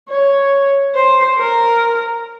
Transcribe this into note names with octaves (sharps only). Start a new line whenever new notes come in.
C#5
C5
A#4